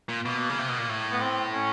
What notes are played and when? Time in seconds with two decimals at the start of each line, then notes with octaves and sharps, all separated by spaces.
0.09 A#2
0.25 B2 A#3
0.49 C#3
0.59 C3
0.69 B2
0.78 A#2
0.89 A2
1.12 B3
1.20 C4
1.53 C#4